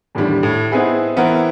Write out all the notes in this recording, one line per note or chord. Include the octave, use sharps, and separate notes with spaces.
E2 A2 D3 D#3 G3 D4
A2
B3 C4 D#4 E4 G#4 B4
E3 B3 C4 E4 A#4